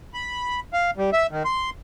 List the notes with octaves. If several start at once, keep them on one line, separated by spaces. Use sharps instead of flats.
B5
F5
G3
E5
D#3
C6